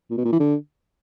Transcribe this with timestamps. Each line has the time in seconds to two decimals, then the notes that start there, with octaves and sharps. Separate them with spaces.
0.10 A#2
0.17 B2
0.25 A#2
0.32 E3
0.40 D3